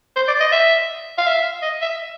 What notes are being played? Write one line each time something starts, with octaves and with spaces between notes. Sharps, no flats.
C5
D5
D#5
E5
F5
E5
D#5
E5